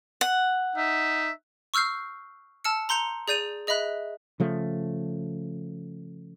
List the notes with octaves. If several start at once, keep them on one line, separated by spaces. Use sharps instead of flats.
F#5
D#4 E5
C#6 E6 F6 G6 C7
A5 E6 F6 C#7
A#5 C6 G6 C#7 F7
G#4 D5 G6 D#7 F7
G#4 D#5 E5 B5 F#6
C#3 F3 A3